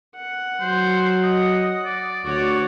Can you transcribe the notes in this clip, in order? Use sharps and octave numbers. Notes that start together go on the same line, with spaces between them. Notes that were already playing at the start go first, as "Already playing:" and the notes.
F#5
F#3 C5
D#5
D5
D2 F#4 C#5